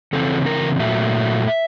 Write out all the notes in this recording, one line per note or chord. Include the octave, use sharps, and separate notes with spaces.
C#3 E3 C4 A4
A#4
A#2 F#3 A3 E5